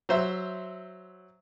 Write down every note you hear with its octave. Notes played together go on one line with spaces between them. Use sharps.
F#3 C5 E5